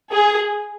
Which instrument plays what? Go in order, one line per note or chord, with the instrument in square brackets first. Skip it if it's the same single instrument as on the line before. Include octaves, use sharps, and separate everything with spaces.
[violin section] G#4